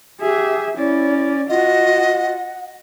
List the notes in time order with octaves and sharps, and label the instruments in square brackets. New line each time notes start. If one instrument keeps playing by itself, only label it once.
[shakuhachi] G4 [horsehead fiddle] G#4 E5
[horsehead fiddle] C#4 D5 [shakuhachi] E4
[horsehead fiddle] F4 F#4 [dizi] D#5 [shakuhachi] F#5